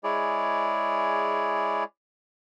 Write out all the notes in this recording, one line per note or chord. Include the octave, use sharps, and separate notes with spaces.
G#3 E4 G#4 C#5 D5